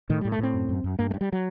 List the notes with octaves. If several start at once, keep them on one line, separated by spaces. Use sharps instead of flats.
A2 D#3
G3
A2
A3
A2 C4
F#2
F#2
F#2
G2 A#3
A3
G2
G3
F#3